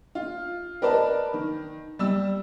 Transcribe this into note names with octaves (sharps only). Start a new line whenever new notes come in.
F4
A#4 B4 D5 D#5 A5
D#3
G3 E6